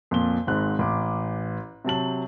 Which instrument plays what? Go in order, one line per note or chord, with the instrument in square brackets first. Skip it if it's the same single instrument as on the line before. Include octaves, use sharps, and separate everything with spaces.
[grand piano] F2 A#2 G7
G#1 G#2 F#6
A1 D6
C3 F#3 A5 F#7